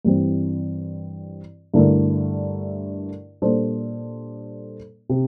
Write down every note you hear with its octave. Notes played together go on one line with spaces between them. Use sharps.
G2 E3 G3 C4
G2 D3 A3 E4 A#4
A#2 G3 D4 A4 C5
C3